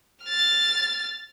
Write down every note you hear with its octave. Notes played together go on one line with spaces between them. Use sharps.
F6 A6